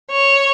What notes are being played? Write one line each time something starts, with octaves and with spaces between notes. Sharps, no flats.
C#5